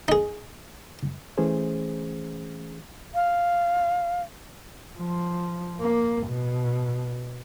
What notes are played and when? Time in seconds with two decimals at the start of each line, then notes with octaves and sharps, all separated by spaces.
0.08 D#4 G#4
1.38 E3 A3 C#4 G#4 C5
3.15 F5
4.98 F3
5.80 A#3
6.27 B2